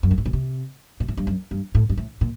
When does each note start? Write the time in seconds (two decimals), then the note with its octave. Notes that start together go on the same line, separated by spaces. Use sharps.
0.03 F#2
0.11 G2
0.18 A2
0.26 A#2
0.33 C3
1.00 A#2
1.08 A2
1.17 G2
1.27 F#2
1.51 G2
1.75 A2
1.89 G2
1.97 A2
2.21 A#2